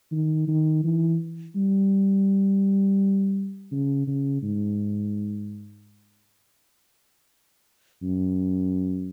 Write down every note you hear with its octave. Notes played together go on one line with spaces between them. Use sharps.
D#3
D#3
E3
G3
C#3
C#3
G#2
F#2